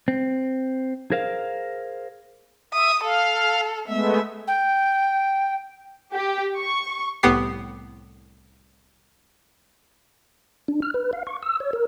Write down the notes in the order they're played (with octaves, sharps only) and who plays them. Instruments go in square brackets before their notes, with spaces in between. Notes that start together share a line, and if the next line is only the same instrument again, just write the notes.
[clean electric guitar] C4
G#4 A#4 C5 F5
[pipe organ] E5 [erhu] D#6
[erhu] A4 [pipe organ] F5
[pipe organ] G#3 A3 B3 [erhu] E5
[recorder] G5
[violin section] G4
C#6
[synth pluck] C2 A2 B3 G4 C7
[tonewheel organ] D4
F6
B4
F5
C#6
E6
C#5
A#4